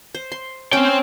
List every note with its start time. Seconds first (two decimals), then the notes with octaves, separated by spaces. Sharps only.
0.15 C5
0.32 C6
0.73 C4 C#4 G5